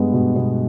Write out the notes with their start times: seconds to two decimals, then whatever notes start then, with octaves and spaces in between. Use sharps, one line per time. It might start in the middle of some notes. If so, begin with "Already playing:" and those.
Already playing: G2 G#3 B3
0.13 B2
0.36 B2